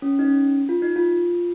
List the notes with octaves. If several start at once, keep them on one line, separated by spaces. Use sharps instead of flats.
C#4
D#4
C#4
F4
D#4
F4